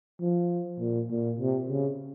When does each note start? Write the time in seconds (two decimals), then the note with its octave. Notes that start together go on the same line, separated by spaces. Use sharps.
0.21 F3
0.79 A#2
1.10 A#2
1.39 C3
1.69 C#3